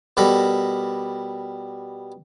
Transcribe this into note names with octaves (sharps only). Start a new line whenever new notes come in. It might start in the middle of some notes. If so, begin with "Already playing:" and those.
B2 G3 A4 A#4 B5